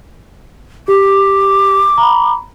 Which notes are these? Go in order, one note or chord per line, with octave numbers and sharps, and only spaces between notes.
G4 D6
A#5 B5